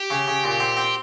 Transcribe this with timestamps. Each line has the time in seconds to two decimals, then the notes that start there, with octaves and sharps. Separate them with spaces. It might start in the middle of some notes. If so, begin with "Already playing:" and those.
Already playing: G4
0.10 C#3
0.27 C#3
0.44 A#2
0.60 C4
0.77 C4